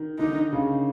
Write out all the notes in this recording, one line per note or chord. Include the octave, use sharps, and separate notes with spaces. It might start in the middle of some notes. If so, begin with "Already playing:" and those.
Already playing: D#3
D3 D#4
C#3